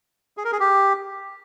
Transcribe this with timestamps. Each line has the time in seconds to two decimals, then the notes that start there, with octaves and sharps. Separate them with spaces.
0.37 G#4
0.45 A#4
0.52 G#4
0.60 G4